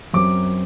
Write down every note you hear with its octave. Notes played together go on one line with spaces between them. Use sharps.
F#2 F#3 C4 D6